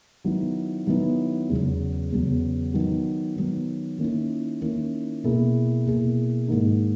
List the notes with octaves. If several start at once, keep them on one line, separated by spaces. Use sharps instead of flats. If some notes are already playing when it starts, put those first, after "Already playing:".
D#3 F#3 B3 E4
D#3 F#3 B3 E4
E2 C#3 F#3 B3
E2 C#3 F#3 B3
D#3 F#3 B3
D#3 F#3 B3
D#3 A#3 C#4 E4
D#3 A#3 C#4 E4
B2 A#3 E4 G#4
B2 A#3 E4 G#4
G#2 D#3 A#3 D#4